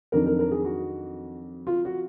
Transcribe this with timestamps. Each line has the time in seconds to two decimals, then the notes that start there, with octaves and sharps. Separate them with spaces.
0.12 F2 D#3 F#3 D4 A#4
0.26 A#4
0.39 A#4
0.51 G#4
0.64 F#4
1.67 F4
1.85 F#4